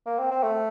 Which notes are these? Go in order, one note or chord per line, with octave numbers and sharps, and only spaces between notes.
A#3
C4
C4
A3